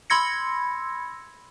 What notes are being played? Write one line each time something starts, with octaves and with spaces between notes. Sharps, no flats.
B5 C6 E6 G#6 A#6 C#7